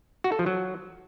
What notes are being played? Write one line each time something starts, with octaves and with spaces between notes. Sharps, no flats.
F#4
A4
F3
F#3